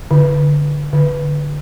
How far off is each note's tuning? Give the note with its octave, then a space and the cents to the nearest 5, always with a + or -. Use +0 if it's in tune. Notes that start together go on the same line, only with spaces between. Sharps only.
D3 -5
D3 +0